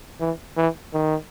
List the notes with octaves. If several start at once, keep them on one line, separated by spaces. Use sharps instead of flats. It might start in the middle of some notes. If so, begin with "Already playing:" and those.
E3
E3
D#3